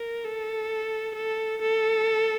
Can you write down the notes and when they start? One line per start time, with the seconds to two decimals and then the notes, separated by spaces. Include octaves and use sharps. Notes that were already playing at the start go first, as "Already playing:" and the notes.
Already playing: A#4
0.25 A4
1.16 A4
1.62 A4